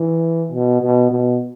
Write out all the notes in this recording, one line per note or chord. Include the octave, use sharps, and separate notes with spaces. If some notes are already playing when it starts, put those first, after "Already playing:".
Already playing: E3
B2
B2
B2